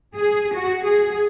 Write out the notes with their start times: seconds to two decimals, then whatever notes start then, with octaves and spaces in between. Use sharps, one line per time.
0.16 G#4
0.54 F#4
0.86 G#4